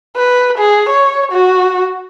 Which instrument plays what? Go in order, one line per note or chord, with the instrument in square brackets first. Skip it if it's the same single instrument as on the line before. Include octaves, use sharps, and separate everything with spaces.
[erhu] B4
G#4
C#5
F#4